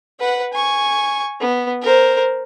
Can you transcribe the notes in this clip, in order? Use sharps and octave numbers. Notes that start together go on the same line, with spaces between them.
B4 F#5
G#5 C#6
B3
A#4 C5